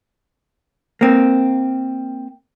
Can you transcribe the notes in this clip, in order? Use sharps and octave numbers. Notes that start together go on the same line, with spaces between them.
A#3 C4